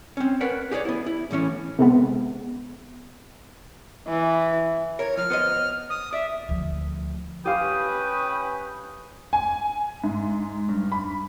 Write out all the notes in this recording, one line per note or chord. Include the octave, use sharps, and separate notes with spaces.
C4 C#4
A#4 B4 C#5 F#5
G4 G#4 B4 C#5 D5
B3 E4
E4
A2 E3 C#4 C#5
C3 G#3 B3
E3
A#4 C#5
F3 F6
B3 C5 D#5
D#6
D5 E5
D2 F3
C#4 G4 B4 F5 G5 D#6
G#5
G#2
G2
B5